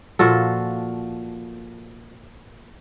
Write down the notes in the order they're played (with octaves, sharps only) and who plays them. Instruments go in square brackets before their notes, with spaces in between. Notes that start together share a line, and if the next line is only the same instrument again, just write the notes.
[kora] A#2 F3 F#4 A4